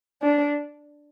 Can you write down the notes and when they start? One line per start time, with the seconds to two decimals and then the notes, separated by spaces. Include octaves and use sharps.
0.22 D4